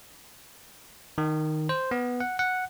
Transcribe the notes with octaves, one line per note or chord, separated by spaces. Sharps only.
D#3
C5
B3
F#5
F#5